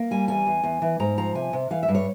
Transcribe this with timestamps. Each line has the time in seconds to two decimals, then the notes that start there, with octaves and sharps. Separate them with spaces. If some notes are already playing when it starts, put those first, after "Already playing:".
Already playing: A#3
0.11 G3 G#5
0.28 E2 G#5
0.47 E2
0.63 E2
0.82 E3
1.00 G#2 A#5
1.17 F3 A#5
1.35 C3 G#5
1.53 C3
1.71 E3 F5
1.83 E5
1.88 G2
1.95 C#5